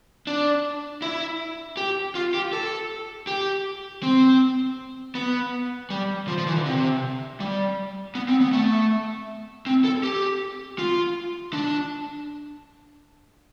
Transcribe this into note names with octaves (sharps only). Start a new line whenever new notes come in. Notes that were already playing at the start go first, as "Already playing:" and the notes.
D4
E4
G4
F4
G4
A4
G4
C4
B3
G3
F3
F3
E3
D3
C3
G3
B3
C4
B3
A3
C4
A4
G4
F4
D4